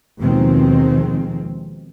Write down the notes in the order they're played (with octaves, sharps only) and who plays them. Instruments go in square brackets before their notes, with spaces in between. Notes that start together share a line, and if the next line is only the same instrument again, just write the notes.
[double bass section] D#2 B2 D#3 F3 G#3 C4